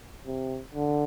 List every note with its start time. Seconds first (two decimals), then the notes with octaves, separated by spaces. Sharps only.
0.26 C3
0.74 D3